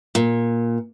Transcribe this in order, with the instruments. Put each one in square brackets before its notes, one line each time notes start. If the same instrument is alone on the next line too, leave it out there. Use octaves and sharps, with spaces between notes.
[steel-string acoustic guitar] A#2